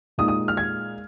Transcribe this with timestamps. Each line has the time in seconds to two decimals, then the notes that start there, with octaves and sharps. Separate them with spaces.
0.18 A#2 G#3 D#4 D#6
0.28 D#6
0.48 F6
0.57 G#6